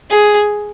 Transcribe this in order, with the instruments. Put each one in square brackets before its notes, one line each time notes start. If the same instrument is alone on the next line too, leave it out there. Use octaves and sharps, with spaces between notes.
[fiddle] G#4